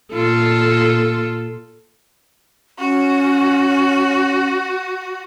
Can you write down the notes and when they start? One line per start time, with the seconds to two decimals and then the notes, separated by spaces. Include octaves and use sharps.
0.13 A#2 F4 A4
2.79 C#4 F#4